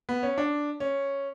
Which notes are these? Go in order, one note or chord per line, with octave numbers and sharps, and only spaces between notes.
B3
C#4
D4
C#4